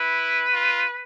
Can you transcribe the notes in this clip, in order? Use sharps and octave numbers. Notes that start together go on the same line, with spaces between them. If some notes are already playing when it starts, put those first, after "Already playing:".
Already playing: E4 B4
F4